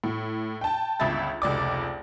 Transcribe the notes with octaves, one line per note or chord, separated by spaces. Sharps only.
A2
G5 A5
G1 C#2 E5 B5 A6
F1 C#2 D5 D6